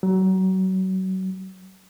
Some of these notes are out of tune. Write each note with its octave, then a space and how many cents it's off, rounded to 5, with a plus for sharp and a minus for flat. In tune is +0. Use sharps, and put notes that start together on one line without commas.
F#3 +30